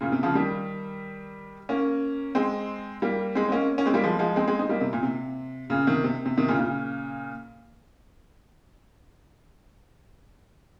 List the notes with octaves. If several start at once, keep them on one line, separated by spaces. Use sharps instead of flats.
A#2 C#3
C3
C#3 F3
D#3 G3
A#3 C#4
G#3 C4
G3 A#3
G#3 C4
C4
A#3 C#4
A#3 C#4
G#3 C4
G3 A#3
F3 G#3
F3 G#3
G#3 C4
G#3 C4
C4 D#4
G3 A#3
C3
A#2
C3
A#2 C#3
C3 D#3
C3
C3
C3 D#3
A#2 C#3
A#2 C#3